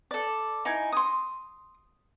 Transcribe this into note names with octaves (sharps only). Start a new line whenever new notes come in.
A4 D5
D#4 E4 G#5
C6 D#6